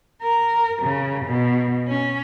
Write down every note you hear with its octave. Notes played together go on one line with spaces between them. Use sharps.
A#4
C#3
B2
C#4